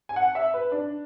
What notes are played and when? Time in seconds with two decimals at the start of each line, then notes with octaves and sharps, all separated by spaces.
0.09 G#5
0.16 F#5
0.35 E5
0.54 B4
0.72 D4